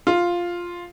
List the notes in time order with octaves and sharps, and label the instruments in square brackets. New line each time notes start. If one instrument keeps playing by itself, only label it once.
[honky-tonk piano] F4